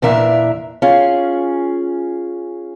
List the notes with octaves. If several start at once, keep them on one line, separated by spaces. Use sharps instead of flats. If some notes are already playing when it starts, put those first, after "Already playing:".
E2 A#2 E3 D4 A#4 E5
C#4 F4 G#4